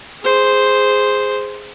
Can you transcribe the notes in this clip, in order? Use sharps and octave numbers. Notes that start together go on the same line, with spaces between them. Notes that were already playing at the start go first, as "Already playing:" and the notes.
G#4 C5